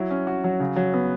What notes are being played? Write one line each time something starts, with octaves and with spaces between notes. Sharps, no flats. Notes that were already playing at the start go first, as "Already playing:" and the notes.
Already playing: F#3 E4
C#4
F#4
F#3
C#3
F#3
B3